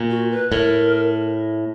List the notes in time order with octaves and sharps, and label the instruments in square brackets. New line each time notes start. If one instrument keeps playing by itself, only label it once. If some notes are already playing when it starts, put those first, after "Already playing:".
Already playing: [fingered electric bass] A#2
[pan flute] F#4
B4
[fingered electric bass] A2 [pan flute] A#4